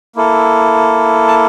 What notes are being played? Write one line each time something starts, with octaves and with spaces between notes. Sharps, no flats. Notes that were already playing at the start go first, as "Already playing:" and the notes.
A#3 E4 A4
A5